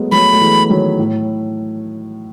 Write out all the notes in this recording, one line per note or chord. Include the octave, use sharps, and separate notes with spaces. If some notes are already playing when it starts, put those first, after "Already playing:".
Already playing: F#3 G#3 A3 B3
F#3 A3 B5
A3
E3 G#3
D#3 F#3
A2